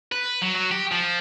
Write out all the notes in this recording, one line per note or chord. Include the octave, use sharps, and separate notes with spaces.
B4
F#3
F#3
G4
F3